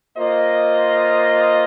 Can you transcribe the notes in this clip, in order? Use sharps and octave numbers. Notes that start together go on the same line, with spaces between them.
A#3 F4 C5 D#5